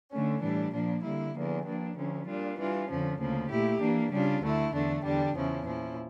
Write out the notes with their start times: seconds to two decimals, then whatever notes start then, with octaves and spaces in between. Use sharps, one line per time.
0.10 D3 A3 C#4
0.41 A2 E3 G3 D4
0.71 A#2 F3 A#3 D4
1.03 D3 G3 A#3 E4
1.34 E2 D3 F3 A#3
1.64 G2 F3 A#3 D4
1.96 D2 D3 F3 C#4
2.26 A#2 G3 D4 F4
2.57 E3 G3 D4 F4
2.87 F2 D3 F3 C#4
3.18 D2 C#3 F3 A#3
3.49 A#2 A3 E4 G4
3.80 E3 A#3 D4
4.11 C#3 G3 D4 F4
4.41 D2 D3 A3 E4
4.73 E2 D3 A3 D4
5.03 E2 D3 G3 D4 G4
5.34 E2 C#3 F3 C#4 E4
5.65 A#2 F3 C#4 E4